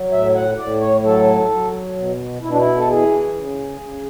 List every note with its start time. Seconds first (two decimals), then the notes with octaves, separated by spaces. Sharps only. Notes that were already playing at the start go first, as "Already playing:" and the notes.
Already playing: F#3
0.11 A2 E5
0.35 F#5
0.58 A2 D5
0.80 C#5
1.03 F#3 A4
1.50 F#3
1.96 B2
2.42 B2 E4
2.50 D4
2.57 E4
2.78 A4
2.88 E3 G#4
3.34 C#3
3.81 C#3